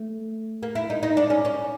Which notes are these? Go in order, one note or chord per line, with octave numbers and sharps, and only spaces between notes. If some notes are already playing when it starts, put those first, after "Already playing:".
Already playing: A3
A#3
E4
D#4
D#4
D4
C#4
C#4